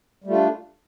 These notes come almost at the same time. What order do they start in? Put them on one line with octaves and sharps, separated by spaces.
G3 A3 F4 D4